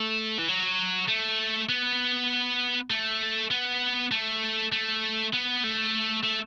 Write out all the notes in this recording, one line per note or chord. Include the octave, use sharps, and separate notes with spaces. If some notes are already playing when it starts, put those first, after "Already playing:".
Already playing: A3
E3
F#3
A3
B3
A3
B3
A3
A3
B3
A3
A3